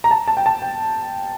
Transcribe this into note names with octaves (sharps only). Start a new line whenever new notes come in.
A#5
A5
A5
G5
A5
G5